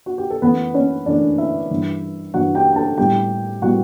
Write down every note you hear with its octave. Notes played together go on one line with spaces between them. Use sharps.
F#4
G4
A4
F#2 E3 A3 B3 B4
C#4 C#5
F#2 E3 A3 D4 D5
E4 E5
G2 E3 G3
G2 E3 G3 F#4 F#5
G4 G5
G5
A4 A5
A2 G3 B3 G4 G5
A2 G3 B3 F#4 F#5